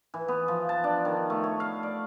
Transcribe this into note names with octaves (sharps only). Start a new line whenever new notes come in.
E3
B3
F3
A5
D4
D#3
A3
C#5
F5
D5